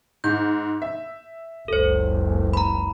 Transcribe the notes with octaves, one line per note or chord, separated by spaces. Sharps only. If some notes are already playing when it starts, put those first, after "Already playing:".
G#2 G6
E5
F#1 C#2 A4 C5
A#5 B5